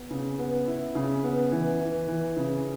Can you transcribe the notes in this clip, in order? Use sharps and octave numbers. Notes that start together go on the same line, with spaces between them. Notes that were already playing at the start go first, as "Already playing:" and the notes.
Already playing: B3
C#3
B3
E4
C#3
B3
E3
E3
E3
C#3